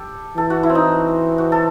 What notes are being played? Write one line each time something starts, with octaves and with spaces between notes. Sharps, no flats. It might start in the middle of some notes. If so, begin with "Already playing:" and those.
Already playing: G4 A4
E3 A4
F#4
E4
C4
D#4
F#4
A4